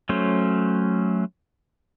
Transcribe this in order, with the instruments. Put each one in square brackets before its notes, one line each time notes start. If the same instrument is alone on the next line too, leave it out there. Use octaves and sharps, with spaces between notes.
[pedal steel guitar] F#3 A3 C#4 C5